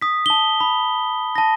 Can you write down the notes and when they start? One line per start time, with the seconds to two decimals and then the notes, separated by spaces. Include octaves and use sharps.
0.01 D#6 B6
0.26 A5 G7
0.60 B5
1.36 A5 A#6